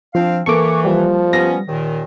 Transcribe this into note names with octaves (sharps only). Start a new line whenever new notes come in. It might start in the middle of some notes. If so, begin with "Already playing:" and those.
F3 C4 D4 F5
E3 A#3 A4 C#6 D6
F3 G3
B3 C#4 A#6
D#2 A#2 D#3